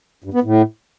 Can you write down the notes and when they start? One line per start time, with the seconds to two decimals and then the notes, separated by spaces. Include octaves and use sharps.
0.24 G2
0.34 B3
0.43 A2